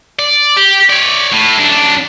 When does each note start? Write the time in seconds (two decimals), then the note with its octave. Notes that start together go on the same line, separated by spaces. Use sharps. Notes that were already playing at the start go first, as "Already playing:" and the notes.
0.19 D5
0.56 G4
0.89 C#5 D5
1.33 A2
1.58 F#2 D4